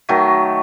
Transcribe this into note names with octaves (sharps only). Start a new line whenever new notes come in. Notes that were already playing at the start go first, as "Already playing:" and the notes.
D#3 F#3 A3